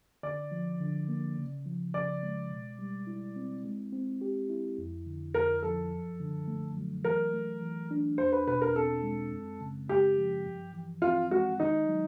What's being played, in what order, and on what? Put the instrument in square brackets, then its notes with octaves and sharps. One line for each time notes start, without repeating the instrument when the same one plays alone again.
[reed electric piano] D3 [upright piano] D5
[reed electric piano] F3
D3
A#3
C#3
F3
[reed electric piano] C#3 [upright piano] D5
[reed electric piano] G#3
B2
G3
E4
C4
G#3
C4
G4
E4
F2
D3
[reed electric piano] F2 [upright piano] A#4
[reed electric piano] F3 [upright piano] A4
[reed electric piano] F#2
D3
A3
F#3
[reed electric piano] E3 [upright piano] A#4
[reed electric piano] A3
E3
D4
[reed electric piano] E2 [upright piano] C5
[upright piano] B4
[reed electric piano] B2 [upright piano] B4
[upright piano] A#4
[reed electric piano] C4 [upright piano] A4
[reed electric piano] G#3
F#2
C#3
[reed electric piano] G#3 [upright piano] G4
[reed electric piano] F3
G2
E3
[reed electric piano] C4 [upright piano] F4
[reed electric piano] G#3 [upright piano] F#4
[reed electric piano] D#3 [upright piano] D#4
[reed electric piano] F#3